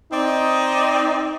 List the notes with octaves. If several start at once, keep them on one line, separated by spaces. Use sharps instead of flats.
C4 D#4 D5 D#5